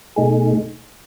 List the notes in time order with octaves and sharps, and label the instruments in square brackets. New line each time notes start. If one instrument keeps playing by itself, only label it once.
[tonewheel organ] B2 A3 D#4 G#4